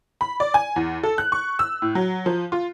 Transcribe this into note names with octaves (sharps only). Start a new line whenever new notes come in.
B5
D5
G#5
E2
A4
F#6
C#6
E6
A2
F#3
F3
F4